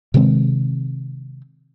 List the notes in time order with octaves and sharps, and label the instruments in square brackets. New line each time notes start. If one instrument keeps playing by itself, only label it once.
[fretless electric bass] C3 D#3 G#3 C4